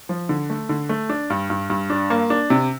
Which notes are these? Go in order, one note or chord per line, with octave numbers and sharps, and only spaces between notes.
F3
D3
A3
D3
A3
D4
G2
G2
G2
D4
A#3
D4
C3